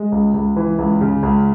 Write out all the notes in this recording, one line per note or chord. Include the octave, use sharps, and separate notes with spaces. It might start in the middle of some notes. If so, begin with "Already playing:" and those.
Already playing: G#3
C#2
C#2
E3
C#2
C#3
C#2